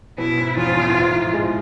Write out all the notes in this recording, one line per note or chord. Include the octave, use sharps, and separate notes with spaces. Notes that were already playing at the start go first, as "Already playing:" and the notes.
B2 E4
G#2
E2 F4
F2
E2
A2
G#2
A2
F3
G#3